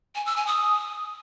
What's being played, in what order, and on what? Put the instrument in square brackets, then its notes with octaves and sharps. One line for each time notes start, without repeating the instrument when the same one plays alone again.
[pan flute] G#5
E6
G#5
D#6